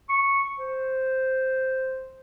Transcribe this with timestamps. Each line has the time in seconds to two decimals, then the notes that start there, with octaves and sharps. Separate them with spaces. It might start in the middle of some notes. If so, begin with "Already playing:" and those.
0.09 C#6
0.59 C5